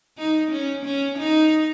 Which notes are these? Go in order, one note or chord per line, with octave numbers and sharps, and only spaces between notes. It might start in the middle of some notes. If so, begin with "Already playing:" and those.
D#4
C#4
C#4
D#4